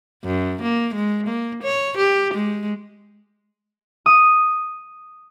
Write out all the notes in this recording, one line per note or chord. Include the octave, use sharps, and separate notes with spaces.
F#2
A#3
G#3
A#3
C#5
G4
G#3
D#6